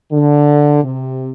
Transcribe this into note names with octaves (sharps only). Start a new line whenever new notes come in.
D3
C3